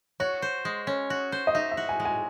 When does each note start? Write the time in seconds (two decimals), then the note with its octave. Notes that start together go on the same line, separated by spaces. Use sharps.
0.20 F#4 C#5
0.42 C5
0.65 G#3
0.87 C#4
1.10 F#4
1.32 C5
1.47 D#5
1.55 D#4 E5
1.72 E5
1.77 F#4
1.89 G#5
2.00 G#3
2.05 G#5